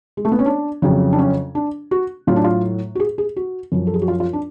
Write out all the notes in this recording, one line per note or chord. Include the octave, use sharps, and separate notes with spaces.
G#3
A3
B3
C#4
D4
F2 C#3 F#3
D4
C#4
D4
F#4
A2 F#3 F4
D4
F4
F#4
G#4
G#4
F#4
F#2 F3
A4
G#4
F#4
F4
F4
D4